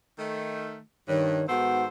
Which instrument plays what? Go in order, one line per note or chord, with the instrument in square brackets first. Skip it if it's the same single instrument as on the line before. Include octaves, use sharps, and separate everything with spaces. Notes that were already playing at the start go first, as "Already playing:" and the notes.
[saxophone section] D#3 A3
[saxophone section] G2 [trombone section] D#3 [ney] C#5
[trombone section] G#2 B3 F#4 [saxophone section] D#3 A4 C5 [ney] F#5